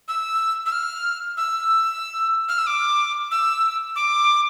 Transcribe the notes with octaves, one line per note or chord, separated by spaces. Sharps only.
E6
E6
F6
E6
F6
E6
D6
E6
D6